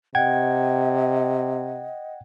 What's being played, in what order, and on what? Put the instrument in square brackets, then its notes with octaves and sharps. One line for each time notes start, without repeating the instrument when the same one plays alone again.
[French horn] C3 [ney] D#5 [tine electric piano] F#5 G5 G#6